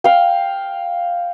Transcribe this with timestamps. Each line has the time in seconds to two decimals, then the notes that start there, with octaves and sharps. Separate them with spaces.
0.04 F5 G5